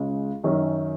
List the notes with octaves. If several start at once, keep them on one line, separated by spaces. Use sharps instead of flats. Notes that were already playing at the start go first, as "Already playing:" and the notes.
Already playing: C#2 C#3 G#3
F#2 D#3 F#3 C#4